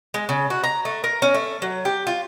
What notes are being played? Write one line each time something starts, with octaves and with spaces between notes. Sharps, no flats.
G#3
C#3
F#4
A#5
A3
A#4
C#4
A3
F#3
G4
F4